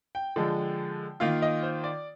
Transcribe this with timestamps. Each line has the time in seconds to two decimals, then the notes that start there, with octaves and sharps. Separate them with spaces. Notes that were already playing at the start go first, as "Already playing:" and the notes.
0.15 G5
0.36 D3 F3 G#3
1.20 D#3 A#3 F4 F5
1.42 D#5
1.63 C5
1.84 D5